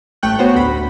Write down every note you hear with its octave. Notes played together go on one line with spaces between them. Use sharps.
A1 A3 G5 C#6 F#6
B3 F#4 C5 C#5
A1 D2 B5